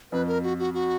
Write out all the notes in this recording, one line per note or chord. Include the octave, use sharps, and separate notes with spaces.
F2 B4
A#4
F#4
F#4
F#4